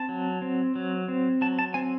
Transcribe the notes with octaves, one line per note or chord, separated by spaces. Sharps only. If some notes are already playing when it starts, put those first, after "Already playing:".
Already playing: C4 A5
F#3
C4
F#3
C4
F#3 A5
A5
C4 G#5